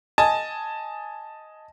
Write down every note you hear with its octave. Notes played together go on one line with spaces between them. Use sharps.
D#5 G#5 A5